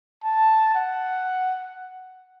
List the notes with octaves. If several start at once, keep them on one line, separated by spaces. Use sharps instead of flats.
A5
F#5